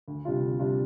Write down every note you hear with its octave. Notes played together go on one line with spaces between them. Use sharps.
D2
C3 G3 D4 F4
D2
C3 G3 D4 F4